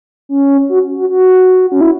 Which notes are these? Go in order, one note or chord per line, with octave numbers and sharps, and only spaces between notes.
C#4
F#4
F#4
F#4
C#4
E4